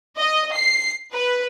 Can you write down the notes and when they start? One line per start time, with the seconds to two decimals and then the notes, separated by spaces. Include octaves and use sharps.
0.18 D#5
0.53 C7
1.12 B4